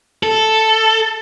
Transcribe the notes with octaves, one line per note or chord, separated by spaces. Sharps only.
A4